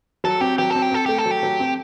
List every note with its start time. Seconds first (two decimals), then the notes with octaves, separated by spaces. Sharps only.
0.24 F#3 A4
0.41 C4 G4
0.58 F#3 G4
0.70 C4 A4
0.82 G4
0.92 C4 A4
1.06 A3 G4
1.18 A4
1.26 F#3
1.31 G4
1.43 F#3
1.60 C4